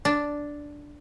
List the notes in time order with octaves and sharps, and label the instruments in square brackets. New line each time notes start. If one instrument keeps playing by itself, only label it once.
[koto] D4